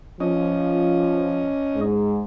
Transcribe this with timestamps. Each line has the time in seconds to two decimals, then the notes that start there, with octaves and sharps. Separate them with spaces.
0.20 F3 C#4 D#5
1.74 G#2